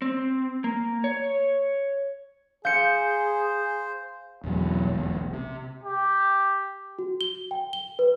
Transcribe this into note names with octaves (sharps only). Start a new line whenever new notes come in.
C4
A#3
C#5
G#4 C5 F5 G6 C#7
E2 B2 F#3
D#1 B1 E2
C3
G4
F#4
G7
G5
G7
B4